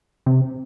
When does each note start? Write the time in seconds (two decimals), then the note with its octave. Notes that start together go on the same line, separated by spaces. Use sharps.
0.26 C3